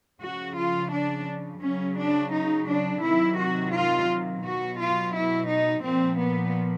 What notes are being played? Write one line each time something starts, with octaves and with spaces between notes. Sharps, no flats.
C#3 F3 F#4
F4
D4
C#3 F#3 C#4
D4
D#4
D4
C3 D#3 F#3 E4
F#4
F4
B2 F#3 F#4
F4
E4
D#4
A#2 F3 C4
B3